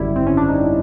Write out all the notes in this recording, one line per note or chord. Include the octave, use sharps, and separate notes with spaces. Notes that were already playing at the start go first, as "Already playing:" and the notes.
Already playing: G#1 F#2 D3 G3 E4
C4
C#4
D4
D#4